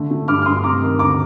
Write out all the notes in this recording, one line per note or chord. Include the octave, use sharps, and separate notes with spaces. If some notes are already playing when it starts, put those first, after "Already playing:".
Already playing: D3 A3
A3
G2 D6 F6
F6
G2 C6 D#6
C3 A#5 D6
D#3
D2 A#5 D6